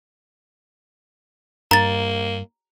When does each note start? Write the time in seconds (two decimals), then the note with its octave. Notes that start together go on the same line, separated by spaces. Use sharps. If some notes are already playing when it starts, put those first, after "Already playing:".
1.71 G2 A#3 A#5 A6